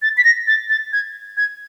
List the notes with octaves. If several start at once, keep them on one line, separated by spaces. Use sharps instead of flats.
A6
B6
A#6
A6
A6
G#6
G#6